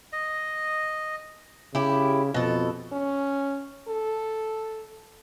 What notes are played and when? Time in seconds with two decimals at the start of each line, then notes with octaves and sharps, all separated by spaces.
0.13 D#5
1.75 C#3 E4 G4
2.34 F2 B2 A4
2.92 C#4
3.88 A4